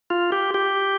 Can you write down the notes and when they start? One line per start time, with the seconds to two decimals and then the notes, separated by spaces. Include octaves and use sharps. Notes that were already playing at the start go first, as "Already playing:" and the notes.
0.10 F4
0.32 G4
0.54 G4